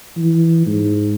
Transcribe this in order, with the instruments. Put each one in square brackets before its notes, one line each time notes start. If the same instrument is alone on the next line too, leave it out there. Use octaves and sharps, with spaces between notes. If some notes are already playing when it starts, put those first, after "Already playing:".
[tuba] E3
G#2